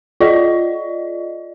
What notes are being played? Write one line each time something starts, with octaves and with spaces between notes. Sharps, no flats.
F4 D5 D#5